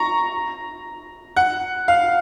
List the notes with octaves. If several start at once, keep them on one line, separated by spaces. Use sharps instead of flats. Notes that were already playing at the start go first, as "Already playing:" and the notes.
Already playing: A#5 C#6
F#5
F5